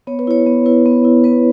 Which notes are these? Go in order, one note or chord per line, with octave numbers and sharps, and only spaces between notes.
B3 C#5
B4
E4 C#5
B3
E4 B4
B3
E4
B3 B4